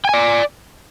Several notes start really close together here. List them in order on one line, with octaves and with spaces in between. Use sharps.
G5 G#5 D5